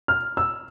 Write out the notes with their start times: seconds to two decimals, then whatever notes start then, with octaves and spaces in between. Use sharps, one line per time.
0.08 F6
0.37 E6